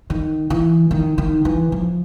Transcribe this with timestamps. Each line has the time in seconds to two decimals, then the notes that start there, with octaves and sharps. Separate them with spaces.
0.10 D#3
0.50 E3
0.91 D#3
1.18 D#3
1.45 E3
1.72 F3